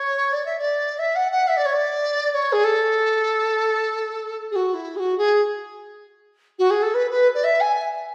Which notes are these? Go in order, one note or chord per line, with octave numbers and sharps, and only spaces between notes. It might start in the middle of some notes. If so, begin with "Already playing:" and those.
Already playing: C#5
D5
E5
D5
E5
F#5
F#5
E5
D5
C#5
D5
D5
C#5
G#4
A4
G#4
F#4
E4
G#4
F#4
G#4
F#4
G#4
A4
B4
B4
D5
E5
G#5